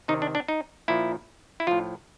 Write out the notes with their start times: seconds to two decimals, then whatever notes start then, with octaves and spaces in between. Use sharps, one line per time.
0.08 C3 D#3 D#4
0.22 D4
0.35 D4
0.48 D#4
0.88 A#2 F3 E4
1.60 E4
1.67 A2 F3 F4